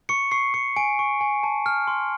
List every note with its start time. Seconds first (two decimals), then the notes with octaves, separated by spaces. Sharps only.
0.09 C#6 C#7
0.31 C#6 C7
0.54 C#6 C#7
0.76 G#5 D7
0.99 C#6
1.21 G#5
1.43 A5
1.66 F6
1.87 C6